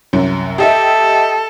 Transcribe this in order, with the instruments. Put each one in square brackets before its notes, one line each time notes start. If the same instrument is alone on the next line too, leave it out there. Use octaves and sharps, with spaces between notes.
[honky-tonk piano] C2 F#2 F#3
[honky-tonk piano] G4 D#5 E5 [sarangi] A4